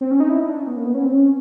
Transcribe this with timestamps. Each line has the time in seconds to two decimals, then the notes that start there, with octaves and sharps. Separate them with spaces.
0.01 C4
0.11 C#4
0.20 D#4
0.29 E4
0.40 D#4
0.49 D4
0.58 C#4
0.67 B3
0.76 A#3
0.86 B3
0.95 C#4
1.05 C4
1.14 C#4